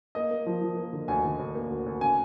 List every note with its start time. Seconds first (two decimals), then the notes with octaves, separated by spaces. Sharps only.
0.15 A#3 D#5
0.31 A#3
0.46 F3
0.61 F3
0.77 A#3
0.93 D3
1.08 D2 G#5
1.24 D3
1.39 D2
1.55 A#3
1.70 D2
1.86 D2
2.01 C#3 G#5